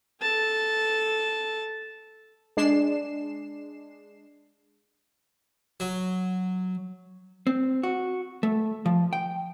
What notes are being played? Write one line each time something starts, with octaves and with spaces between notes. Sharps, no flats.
A4 A5
G#3 D4 C7 E7
F#3
C4
F#4
A3
F3
G5